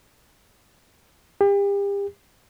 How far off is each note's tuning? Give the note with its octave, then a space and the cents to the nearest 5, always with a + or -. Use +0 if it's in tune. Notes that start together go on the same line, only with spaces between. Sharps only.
G4 +35